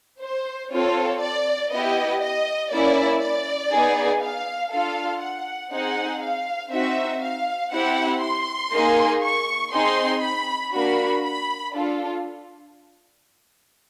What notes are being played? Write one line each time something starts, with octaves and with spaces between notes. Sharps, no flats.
C5
C4 F4 A4 C#5
D5
B3 E4 G4 D#5
D#5
A#3 C#4 E4 D5
D5
B3 D#4 G#4
F5
D4 F4 A4 F5
F#5
C4 D#4 G#4 F#5
F5
C4 D#4 F#4 E5
F5
C4 E4 G4 F#5
C6
A#3 D#4 G#4
C#6
C4 D#4 G#4 C6
B5
A#3 D4 F#4 B5
B5
D4 F4 A4